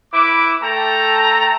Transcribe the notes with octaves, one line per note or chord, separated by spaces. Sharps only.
E4 B4 D6
A3 A4 G5 A5 A#5